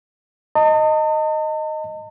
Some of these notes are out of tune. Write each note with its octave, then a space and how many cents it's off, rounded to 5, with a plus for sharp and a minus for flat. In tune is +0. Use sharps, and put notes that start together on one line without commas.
D#5 +0 A5 +45